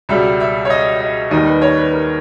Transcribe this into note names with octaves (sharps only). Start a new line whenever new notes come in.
C#2 B2 G3 E5
E5
C#5
D#5
D#5
D#2 D#3 G3 D#5
B4
C#5
B4
A#4